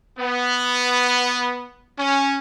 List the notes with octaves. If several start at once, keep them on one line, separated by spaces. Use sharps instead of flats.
B3
C#4